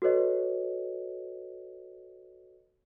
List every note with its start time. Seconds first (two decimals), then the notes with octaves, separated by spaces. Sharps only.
0.02 F#4 A4 B4 C#5 D#5